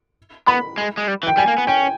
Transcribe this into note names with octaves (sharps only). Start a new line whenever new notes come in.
B3 B5
G#3
G#3
G3
E3
G5
G3 G#5
A#3
B3
C#4 G5